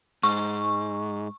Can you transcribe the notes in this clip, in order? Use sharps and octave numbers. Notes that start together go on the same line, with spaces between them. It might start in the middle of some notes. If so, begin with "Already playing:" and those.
G#2 C#6